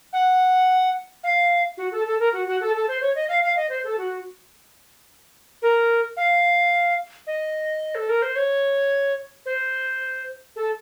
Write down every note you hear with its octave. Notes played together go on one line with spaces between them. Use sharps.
F#5
F5
F#4
A4
A4
A#4
F#4
F#4
A4
A4
C5
C#5
D#5
F5
F5
D#5
C5
A4
F#4
A#4
F5
D#5
A4
A#4
C5
C#5
C5
A4